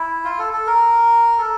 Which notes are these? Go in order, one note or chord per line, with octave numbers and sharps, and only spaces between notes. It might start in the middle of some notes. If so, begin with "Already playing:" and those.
Already playing: E4
F4
A4
A4
A#4
A4